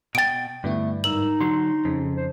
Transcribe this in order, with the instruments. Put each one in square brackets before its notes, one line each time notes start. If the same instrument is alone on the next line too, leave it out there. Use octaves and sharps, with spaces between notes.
[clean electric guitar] B2 G5 [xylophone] A6 D7
[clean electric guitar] G2 [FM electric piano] D3 B3 E4 [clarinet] A3
[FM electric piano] G#2 A#4 E6 [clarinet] D#4 [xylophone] F#7
[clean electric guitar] D3 F#3 [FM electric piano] C6
[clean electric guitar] F2 [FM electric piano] C#3
[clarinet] C5